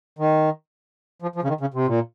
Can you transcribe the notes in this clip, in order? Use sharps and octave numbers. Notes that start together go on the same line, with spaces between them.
D#3
F3
F3
C#3
D#3
C#3
C3
A#2